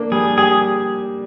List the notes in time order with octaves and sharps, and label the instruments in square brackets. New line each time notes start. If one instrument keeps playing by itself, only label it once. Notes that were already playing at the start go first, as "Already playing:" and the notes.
Already playing: [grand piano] A#3 D4
[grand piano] G3 [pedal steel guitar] G#4
[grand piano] G4 [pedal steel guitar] G#4